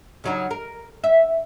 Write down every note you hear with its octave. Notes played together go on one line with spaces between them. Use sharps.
C#3 F#3 D#4
A#4
E5